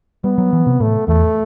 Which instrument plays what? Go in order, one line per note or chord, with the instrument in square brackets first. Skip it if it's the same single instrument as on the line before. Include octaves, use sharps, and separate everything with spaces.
[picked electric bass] G3 [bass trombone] B3
[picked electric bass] F#3
E3
C3
[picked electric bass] A2 [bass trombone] A3
[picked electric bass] E2 [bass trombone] A3